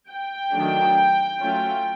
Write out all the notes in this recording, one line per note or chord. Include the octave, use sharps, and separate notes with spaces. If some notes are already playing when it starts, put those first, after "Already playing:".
G5
D#3 F#3 A3 D4
F#3 A3 C#4 F4